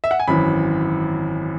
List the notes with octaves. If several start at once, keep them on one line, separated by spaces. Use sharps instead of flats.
E5
F#5
G#5
G#1 F#2 E3 B5